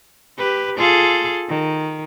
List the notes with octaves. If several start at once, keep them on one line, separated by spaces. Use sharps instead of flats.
G4 B4
F4 G#4 A4
D#3